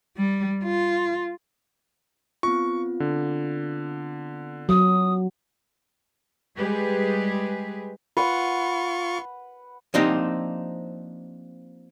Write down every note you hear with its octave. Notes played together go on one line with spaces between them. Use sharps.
G3
F4
B3 C4 F4 C#6
D3
F#3 D#6
G3 G#3 G4 G#4 B4
F4 B4 F#5 C#6
F3 A#3 C4 D4 D#4 G4